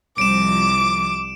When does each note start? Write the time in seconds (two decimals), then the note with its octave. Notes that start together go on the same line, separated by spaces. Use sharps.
0.18 C2 F3 D6 D7 E7